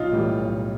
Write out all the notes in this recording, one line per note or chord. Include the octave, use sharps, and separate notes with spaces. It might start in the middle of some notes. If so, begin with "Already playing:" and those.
Already playing: B1 D#4 F4
A2 E3 G3
B1